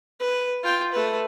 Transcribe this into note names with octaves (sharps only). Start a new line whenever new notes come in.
B4
F4 G5
A3 B4